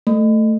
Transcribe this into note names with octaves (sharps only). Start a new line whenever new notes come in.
A3